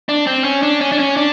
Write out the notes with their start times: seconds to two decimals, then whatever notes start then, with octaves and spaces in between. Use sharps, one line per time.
0.09 D4
0.27 C4
0.44 C#4
0.63 D4
0.81 C#4
0.92 D4
0.99 C#4
1.17 D4